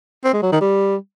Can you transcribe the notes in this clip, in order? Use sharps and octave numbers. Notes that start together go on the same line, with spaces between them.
C4
G#3
F#3
D#3
G3